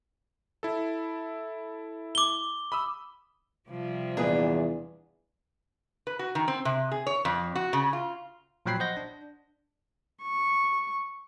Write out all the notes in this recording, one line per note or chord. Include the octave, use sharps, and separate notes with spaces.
E4 A4
D6 G7
B5 D#6 E6
C3 F3 G3
E2 A#2 D4 G#4 B4
B4
F#4
D#3
C4
C3
G#4
C#5
F2
F#4
C#3
F4
A#2 F3 F#3 G5 B5 C7
C5 D#5 F#5 G6 A#6
D4
C#6